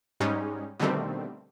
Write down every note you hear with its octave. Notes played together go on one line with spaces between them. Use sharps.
G#2 G3 G#3 C#4 D#4
B2 D3 D#3 G3 A3 C4